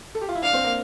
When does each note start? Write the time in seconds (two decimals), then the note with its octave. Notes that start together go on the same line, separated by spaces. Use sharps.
0.15 A4
0.21 G4
0.29 F4
0.35 E4
0.43 D4 F5
0.53 C4
0.64 A#3